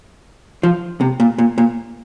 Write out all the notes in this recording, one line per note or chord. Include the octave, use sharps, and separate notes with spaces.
F3
C3
A#2
A#2
A#2